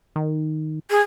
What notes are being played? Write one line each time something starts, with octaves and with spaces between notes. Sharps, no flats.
D#3
G#4